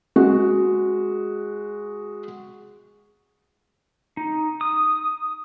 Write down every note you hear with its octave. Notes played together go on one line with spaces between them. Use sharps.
G#3 F#4
D#4
D#6